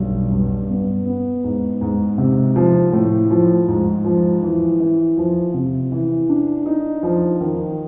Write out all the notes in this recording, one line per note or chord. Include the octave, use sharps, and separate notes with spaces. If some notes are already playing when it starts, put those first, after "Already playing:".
Already playing: B1 G2
G2
B3
B3
G#2
G#2
C3
F3
A2
F3
G#2
F3
E3
E3
F3
C3
E3
D4
D#4
F3
D#3